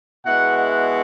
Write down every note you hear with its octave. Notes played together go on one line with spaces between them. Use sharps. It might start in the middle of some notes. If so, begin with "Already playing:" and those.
B2 G#3 B3 E4 F#5
F#5